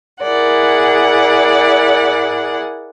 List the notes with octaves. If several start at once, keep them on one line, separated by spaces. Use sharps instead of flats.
E4 G#4 A#4 D5 F#5